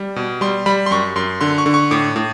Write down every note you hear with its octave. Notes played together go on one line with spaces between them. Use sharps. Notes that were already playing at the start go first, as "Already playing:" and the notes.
Already playing: G3
B2
G3 C6
G3 B5
C6
F#2 C#6
F#2 C6
D3 C6
C#6
D3
C#6
A2 D6
A2